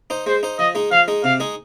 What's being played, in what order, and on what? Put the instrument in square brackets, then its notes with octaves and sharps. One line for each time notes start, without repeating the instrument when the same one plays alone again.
[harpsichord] D#4 C5
[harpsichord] G#3 [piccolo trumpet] C5
[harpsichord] D#4 C5
[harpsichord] F3 [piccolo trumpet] D#5
[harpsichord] G#3 D#4
[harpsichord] F3 [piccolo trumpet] F5
[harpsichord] G#3 D#4
[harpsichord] C3 [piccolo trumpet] F5
[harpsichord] G#3 D#4 G#4